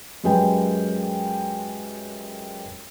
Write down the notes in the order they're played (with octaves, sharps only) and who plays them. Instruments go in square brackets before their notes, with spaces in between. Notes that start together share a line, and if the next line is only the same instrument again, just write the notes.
[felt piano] F#2 F#3 G#3 G4 B4 G5